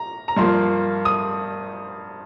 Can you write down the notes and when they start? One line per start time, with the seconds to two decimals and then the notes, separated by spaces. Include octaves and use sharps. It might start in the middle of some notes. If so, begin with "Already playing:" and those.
Already playing: A#5
0.28 A#5
0.37 G2 F3 A#3 C6
1.05 D#6